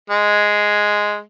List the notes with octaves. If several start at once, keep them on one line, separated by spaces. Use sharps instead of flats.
G#3